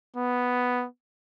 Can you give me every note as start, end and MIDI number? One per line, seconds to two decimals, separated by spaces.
0.16 0.86 59